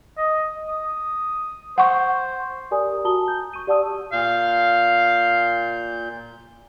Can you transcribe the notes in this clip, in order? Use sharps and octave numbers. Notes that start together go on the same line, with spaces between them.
D#5
D#6
C5 F#5 C#6
G4 A#4 D5 G#5 A#5 D#6
F#4 A5 A#5 D#6 G7
G6
C#6 D#7
G4 D5 F#5 A5 D#6 E6
A#2 F5 G6